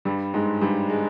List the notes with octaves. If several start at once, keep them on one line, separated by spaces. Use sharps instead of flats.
G2 G3
G#2 G#3
G2 G3
G#3